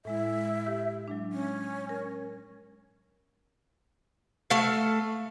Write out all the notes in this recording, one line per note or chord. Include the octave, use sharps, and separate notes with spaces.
A2 G#3 E4 E5
G4
F#3 G#3 D4
C#4
A#4
A3 A4 F5